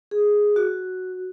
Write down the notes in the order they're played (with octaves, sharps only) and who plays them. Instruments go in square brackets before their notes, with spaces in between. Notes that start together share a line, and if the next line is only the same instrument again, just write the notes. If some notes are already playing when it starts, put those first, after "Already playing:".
[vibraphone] G#4
F#4